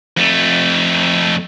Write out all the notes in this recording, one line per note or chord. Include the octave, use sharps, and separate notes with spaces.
F2 A3